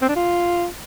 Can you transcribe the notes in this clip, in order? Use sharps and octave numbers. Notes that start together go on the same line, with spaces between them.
C4
D4
F4